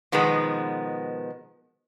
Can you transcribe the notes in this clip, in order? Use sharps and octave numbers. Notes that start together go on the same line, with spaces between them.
B2 D#3 F3 G#3 B3